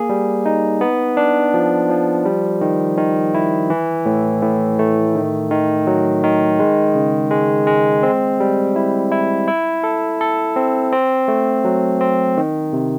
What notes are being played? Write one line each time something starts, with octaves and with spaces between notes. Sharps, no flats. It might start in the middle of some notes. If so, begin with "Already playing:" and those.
Already playing: A#3 G#4
G3
D#4
B3
D4
F3
F3
G3
D#3
D#3
E4
E3
A2
A2
A3
D#3
D#3
F#3
D#3
G#3
C#3
G#3
G#3
C4
G3
E4
E4
E4
A4
A4
C4
C4
A3
F#3
C4
D#3
C3